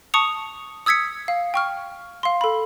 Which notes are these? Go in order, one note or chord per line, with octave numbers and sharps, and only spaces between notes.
A5 C#6 D#6 C#7 F7
D#6 E6 G#6 B6 C#7
F5
G5 C#6 F6
F5 C6
A4 B5